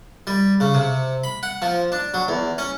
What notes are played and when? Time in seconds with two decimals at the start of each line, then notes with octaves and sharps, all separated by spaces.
0.27 G3
0.60 C#3
0.74 C3
1.24 B5
1.43 F#5
1.62 F3
1.92 D4
2.14 F#3
2.28 E2
2.58 C#4